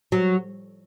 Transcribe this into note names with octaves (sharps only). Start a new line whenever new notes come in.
F#3